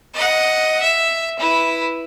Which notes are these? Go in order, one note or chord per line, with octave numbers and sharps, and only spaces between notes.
D#5 F#5
E5
E4 B4